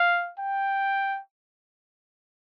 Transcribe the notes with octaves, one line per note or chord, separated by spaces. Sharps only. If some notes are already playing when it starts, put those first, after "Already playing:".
Already playing: F5
G5